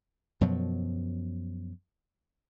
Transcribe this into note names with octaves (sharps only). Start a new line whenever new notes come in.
F#2 B2 F3 F#3